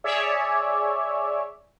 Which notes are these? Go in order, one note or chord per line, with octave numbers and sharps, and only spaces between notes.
G#4 C#5 D5 E5